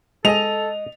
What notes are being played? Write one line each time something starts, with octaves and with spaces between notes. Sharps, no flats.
G#3 G#4 A4 D#5 F7